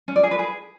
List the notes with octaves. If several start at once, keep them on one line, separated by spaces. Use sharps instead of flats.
C#4
D5
G#4
B4
G#4